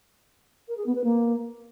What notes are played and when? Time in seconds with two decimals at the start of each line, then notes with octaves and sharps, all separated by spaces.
0.68 A#4
0.77 G#4
0.86 B3
0.95 B4
1.04 A#3